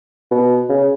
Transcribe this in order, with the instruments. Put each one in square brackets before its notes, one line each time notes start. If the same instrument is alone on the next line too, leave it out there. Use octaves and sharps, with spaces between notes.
[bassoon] B2
C#3